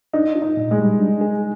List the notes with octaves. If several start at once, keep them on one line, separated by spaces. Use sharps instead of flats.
D4 D#4
F4
D#4
A#2
G#3
G3
D4
G#4